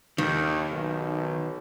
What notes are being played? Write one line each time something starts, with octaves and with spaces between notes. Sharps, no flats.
D#2 D#3
B1